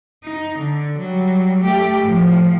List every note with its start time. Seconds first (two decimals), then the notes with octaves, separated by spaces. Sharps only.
0.24 D#4
0.59 D3
0.99 F#3 G3
1.62 A3 G4
2.03 A2 F3